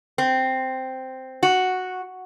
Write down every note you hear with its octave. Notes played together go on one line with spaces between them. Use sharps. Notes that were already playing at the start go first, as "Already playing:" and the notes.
C4
F#4